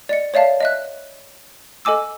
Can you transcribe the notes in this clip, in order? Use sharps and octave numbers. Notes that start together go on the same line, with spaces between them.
D5 D#5 C#7
C#5 D5 E5 F5 A5
D#5 E5 F#6
A4 D#5 G#5 D6 E6